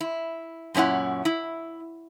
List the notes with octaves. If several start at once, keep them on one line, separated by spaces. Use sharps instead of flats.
E4
F#2 A#2 C#4 E4 F#5
E4